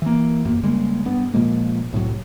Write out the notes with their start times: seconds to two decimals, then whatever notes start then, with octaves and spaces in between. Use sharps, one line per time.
0.02 E3 A#3
0.45 A#1 F#2 A#3
0.63 C#3 G3 G#3 A#3
1.05 G2 B3
1.34 A#2 F3 G#3 A#3
1.92 C2 A2 C3 F#3